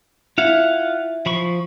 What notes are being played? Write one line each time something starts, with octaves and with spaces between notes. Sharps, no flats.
E4 F4 F5 F#5
F3 B5 C#6